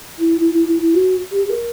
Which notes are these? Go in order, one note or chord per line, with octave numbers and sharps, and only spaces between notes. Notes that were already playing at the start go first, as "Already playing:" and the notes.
E4
E4
E4
E4
E4
F#4
G4
G4
A#4